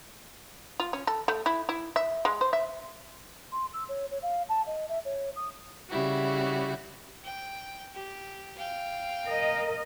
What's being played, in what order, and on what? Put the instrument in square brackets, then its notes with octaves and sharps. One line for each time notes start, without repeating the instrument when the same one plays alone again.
[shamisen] F4
C#4
A4
A3
E4
E4
E5
G#3
C5
E5
[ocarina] C6
E6
C#5
C#5
F5
A5
D#5
E5
C#5
D#6
[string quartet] C#3 G3 E4 F#4
[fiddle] G5
G4
F5 G5
[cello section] A#4 D#5